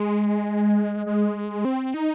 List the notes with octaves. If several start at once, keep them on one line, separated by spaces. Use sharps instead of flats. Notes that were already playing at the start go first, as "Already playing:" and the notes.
Already playing: G#3
G#3
C4
D#4